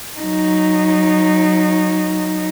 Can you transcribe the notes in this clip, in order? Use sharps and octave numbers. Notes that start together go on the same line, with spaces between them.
F#3 D#4